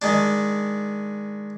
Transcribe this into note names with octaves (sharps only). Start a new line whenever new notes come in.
D#3 G#3 D4